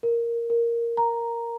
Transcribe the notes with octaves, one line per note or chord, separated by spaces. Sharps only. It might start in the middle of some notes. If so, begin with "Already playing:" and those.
A#4
A#4
A#5